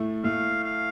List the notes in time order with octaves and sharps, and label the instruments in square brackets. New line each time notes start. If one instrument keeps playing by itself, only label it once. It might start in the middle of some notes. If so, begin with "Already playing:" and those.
Already playing: [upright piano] A2 A3
[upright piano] A2 A3 [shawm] F5
[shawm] F5